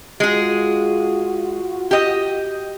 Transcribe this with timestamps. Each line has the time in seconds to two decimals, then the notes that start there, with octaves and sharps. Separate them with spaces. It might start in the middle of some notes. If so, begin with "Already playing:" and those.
0.20 G#3 F4 F#4 G#4
1.91 G4 D#5